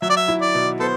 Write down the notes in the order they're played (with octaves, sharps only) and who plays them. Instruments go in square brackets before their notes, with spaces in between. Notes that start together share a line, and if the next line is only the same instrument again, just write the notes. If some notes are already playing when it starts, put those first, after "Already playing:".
[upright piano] F#3 [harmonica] E5
[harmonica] D5
E5
[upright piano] E4
[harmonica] D5
[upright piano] B2
[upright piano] B3 [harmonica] A4 C5